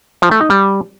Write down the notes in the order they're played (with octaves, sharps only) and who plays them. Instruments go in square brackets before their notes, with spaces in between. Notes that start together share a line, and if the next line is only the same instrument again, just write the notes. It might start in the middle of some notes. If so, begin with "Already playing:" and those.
[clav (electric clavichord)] F3
A3
D#4
G3